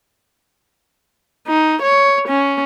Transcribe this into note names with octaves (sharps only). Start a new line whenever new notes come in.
D#4
C#5
C#4